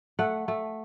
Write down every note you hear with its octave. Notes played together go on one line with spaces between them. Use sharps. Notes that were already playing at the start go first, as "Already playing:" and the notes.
A3 F#5
A3